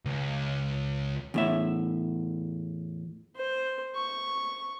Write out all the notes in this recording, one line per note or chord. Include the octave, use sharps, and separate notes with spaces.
C#2
E2 A2 E5
C5
C#6